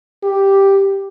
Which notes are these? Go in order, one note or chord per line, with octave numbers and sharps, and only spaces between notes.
G4